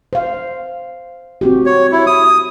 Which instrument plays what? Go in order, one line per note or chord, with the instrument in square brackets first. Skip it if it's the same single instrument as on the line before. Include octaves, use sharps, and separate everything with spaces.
[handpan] C5 F5
C4 F#4 G4
[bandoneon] C#5
E4
D#6